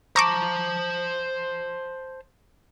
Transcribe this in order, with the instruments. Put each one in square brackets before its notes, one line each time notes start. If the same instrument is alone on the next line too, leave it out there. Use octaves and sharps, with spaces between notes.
[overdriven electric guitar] C5 A5 [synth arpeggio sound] A#5 C#6 D6